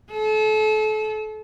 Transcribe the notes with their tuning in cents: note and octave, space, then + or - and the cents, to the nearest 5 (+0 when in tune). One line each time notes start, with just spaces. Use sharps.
A4 -35